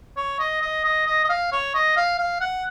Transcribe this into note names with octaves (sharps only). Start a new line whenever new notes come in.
C#5
D#5
D#5
D#5
D#5
D#5
F5
C#5
D#5
F5
F5
F#5